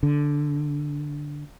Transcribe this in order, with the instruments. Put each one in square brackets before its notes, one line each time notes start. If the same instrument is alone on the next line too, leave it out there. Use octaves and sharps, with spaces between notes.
[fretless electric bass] D3